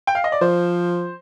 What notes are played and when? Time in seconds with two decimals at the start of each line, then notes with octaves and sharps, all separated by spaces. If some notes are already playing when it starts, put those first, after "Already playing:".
0.07 G5
0.15 F5
0.24 D#5
0.32 D5
0.41 F3 C5